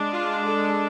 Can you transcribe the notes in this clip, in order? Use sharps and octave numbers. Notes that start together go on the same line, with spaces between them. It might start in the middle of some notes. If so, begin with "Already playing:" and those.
Already playing: G#3 D4
F4
A4